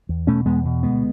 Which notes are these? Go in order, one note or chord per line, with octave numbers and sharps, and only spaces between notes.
E2
B2 A3 C#4
E2 G#3 B3
B2
D2 G#3 B3